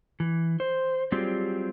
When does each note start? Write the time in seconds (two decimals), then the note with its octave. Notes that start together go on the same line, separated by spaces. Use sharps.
0.20 E3
0.60 C5
1.12 F#3 G3 C4 F4 G4 G#4